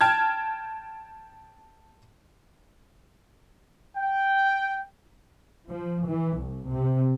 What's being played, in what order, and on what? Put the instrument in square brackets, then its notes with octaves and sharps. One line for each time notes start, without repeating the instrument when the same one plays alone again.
[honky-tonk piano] G5 A5 F6 G#6
[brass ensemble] G5
[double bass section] F3
E3
C2
C3